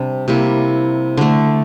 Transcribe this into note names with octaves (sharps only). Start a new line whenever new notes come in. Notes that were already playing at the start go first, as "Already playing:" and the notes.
Already playing: C3 G3 D4
C3 G3 A#3 E4
D3 A3